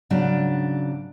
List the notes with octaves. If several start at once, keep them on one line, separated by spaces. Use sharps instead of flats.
G#2 C#3 F#3 D4